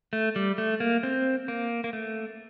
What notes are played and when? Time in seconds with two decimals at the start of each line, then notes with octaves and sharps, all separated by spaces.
0.13 A3
0.36 G3
0.58 A3
0.80 A#3
1.03 C4
1.48 A#3
1.84 A#3
1.93 A3